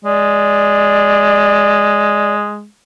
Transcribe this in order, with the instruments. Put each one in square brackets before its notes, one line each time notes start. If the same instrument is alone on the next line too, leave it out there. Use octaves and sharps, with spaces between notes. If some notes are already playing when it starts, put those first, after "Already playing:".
[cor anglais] G#3 [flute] D5